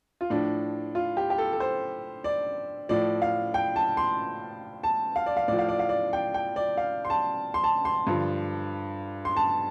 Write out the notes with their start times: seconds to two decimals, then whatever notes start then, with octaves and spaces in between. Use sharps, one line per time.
0.21 F4
0.30 A2 F3 D4
0.95 F4
1.17 G4
1.30 G4
1.38 A4
1.53 A4
1.60 C5
2.24 D5
2.89 A2 F3 D5
3.22 F5
3.54 G5
3.76 A5
3.97 C6
4.83 A5
5.16 F5
5.26 D5
5.37 F5
5.48 A2 F3 D5
5.59 F5
5.69 D5
5.79 F5
5.89 D5
6.13 G5
6.34 G5
6.56 D5
6.77 F5
7.05 C6
7.10 A5
7.54 C6
7.64 A5
7.85 C6
8.07 G2 D3 F3
9.25 C6
9.36 A5